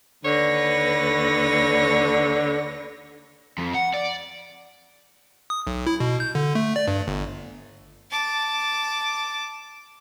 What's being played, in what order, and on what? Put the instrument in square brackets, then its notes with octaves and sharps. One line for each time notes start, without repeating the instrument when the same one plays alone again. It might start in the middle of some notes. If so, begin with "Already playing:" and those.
[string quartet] D#2 B4 A#6 [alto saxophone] D3 [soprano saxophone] C#5
[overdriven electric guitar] F2
F#5
D5
[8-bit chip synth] D#6
B1
E4
B2
G6
D3
A3
D5
G2
G1
[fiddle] A5 D6